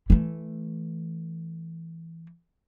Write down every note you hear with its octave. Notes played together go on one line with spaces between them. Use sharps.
E3 A3